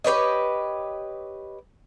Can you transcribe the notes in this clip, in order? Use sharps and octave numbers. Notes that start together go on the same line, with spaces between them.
G4 B4 C#5 D#5